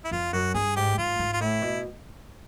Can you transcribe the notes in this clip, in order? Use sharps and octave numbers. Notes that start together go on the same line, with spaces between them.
E4
F2 F4
F#2 F#4
G2 G#4
G#2 G4
G#2 F4
G#2
F4
A2 E4
B2